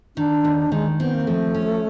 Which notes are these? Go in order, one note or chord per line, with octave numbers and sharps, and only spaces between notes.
D#3 D4
D#2
D#3 G#3
B3 C4
A#3
F3 A3
C#4